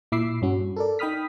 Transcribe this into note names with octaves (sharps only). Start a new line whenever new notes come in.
A#2 E4 B5 D6 E6 C7
G2 C#4 F#4
A4 A#4 D5
D#4 G5 B5 D#6 F6 B6